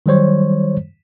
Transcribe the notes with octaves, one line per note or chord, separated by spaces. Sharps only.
D#3 F#3 G3 C5 C#5